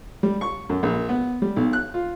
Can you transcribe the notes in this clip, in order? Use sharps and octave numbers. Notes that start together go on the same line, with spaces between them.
G3
C#6
F#2
A#1
B3
G3
B1
F#6
F4